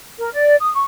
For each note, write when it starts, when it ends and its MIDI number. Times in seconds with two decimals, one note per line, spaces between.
0.18 0.30 70
0.33 0.56 74
0.60 0.72 87
0.74 0.86 85